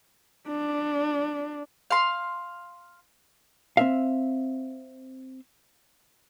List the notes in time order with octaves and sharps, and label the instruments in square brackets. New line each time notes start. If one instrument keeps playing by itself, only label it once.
[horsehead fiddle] D4
[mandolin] F5 C6
[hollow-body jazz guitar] C4 E5 F5